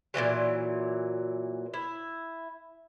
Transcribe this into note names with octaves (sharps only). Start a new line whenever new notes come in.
A#2 D#3 E3 F#3
E4